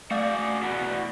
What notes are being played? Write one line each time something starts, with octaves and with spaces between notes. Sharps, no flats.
A3 F#4 G#4 D5 G6 A6
E2 B2 F#4